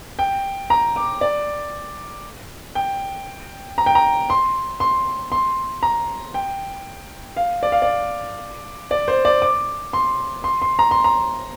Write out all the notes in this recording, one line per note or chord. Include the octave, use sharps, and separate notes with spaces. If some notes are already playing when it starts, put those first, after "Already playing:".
G5
A#5
D6
D5
G5
A#5
G5
A#5
C6
C6
C6
A#5
G5
F5
D5
F5
D5
D5
C5
D5
D6
C6
C6
C6
A#5
C6
A#5